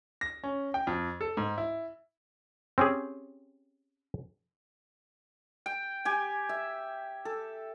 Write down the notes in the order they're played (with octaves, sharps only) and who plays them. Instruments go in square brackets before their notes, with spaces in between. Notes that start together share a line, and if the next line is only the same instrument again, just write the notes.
[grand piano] A#6
C#4
G5
F2
A4
G#2
E4
[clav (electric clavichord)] C4 C#4 G4 G#4
[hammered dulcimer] G5
G4 G#5
E5
A4